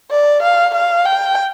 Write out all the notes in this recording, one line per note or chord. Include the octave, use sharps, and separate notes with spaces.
D5
F5
F5
G5